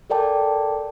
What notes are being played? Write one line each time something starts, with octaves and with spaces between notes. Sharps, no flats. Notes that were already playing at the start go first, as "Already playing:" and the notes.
A4 A#4 D5 G5 A5 D6